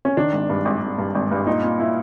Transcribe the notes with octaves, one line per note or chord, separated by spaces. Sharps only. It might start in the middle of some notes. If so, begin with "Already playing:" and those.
C#4
D#3 D4
G#1
G2
G#1
G#1
G2
G#1
G2
A#2 D#4
A#2
A#2 E4